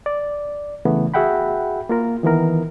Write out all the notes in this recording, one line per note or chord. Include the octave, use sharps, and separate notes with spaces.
D5
C#3 E3 A3 B3
F#4 G#4 E5 F#5 G5 B5
A#3 F4 A#4
D#3 E3 B3 A#4